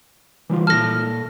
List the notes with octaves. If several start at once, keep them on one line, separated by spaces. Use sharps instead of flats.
E3 G3 F4
A#2 A4 A5 F6 A#6